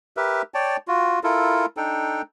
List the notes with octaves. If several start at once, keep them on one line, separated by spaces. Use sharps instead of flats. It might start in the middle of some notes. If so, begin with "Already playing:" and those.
G4 A#4 B4 E5
C#5 D5 G5 A5
F4 F#4
E4 F4 A4 A#4
D4 D#4 A4 G5